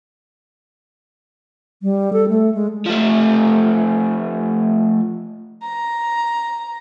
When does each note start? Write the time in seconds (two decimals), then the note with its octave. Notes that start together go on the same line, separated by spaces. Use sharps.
1.82 G3
2.13 A4
2.29 A3
2.54 G#3
2.86 F3 A3
5.63 A#5